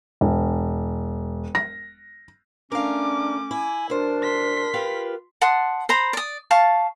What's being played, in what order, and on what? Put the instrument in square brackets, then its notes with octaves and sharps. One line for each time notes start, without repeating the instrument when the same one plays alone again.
[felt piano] E1
A#6
[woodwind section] A3 C#4 [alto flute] D4 [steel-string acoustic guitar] A#4 F5 [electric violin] D6
[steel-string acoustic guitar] E4 [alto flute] G#5
[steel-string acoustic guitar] D2 C5 [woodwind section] D4 [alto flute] A#4
[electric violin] C6 B6
[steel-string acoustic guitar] F4 G4 B4
[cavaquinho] F#5 A5 C6 D#6
C5 A#5 B5
D5 D#6
F5 A5 C#6